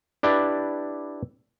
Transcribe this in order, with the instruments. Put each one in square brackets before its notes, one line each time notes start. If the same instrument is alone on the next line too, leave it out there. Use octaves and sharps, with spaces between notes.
[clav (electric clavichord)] D4 E4 G4 B4 D5